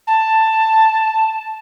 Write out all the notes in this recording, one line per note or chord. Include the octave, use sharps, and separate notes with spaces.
A5